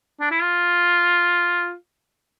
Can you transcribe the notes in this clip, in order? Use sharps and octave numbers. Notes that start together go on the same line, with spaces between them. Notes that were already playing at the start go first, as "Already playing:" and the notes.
D4
E4
F4